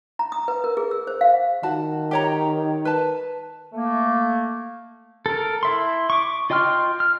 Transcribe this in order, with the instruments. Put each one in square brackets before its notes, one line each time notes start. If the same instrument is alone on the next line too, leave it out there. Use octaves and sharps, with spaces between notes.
[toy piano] A#5
D#6
B4
A#4
G#4
E6
C5
F5
[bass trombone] D#3 [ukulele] F#4 A5
[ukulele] G4 C#5 A#5
B4 A5
[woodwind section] A3 A#3
[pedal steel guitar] A4 A#4
E4 E5 C6
C#6 D6
F4 D#5 G5 C6 F6
F6